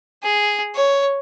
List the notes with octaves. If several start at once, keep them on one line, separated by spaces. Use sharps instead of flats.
G#4
C#5